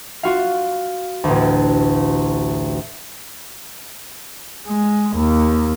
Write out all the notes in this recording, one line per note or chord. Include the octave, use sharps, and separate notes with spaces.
F4 F#4 F5
A1 D2
G#3
D#2